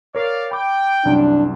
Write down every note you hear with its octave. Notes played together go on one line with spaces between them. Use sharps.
A#4 C#5 D5 F5
G5 B5 D6
C2 F#2 D4